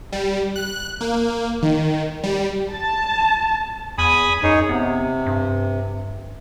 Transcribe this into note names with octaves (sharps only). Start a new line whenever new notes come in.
G3
F#6
A#3
D#3
G3
A5
E2 G#5 B5 D#6
F#2 D#4 G#4 C#5
C3 B3
G2